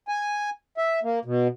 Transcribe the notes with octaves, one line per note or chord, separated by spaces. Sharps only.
G#5
E5
A#3
B2